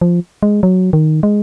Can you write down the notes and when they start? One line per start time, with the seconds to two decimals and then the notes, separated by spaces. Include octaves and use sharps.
0.01 F3
0.43 G#3
0.63 F#3
0.93 D#3
1.23 G#3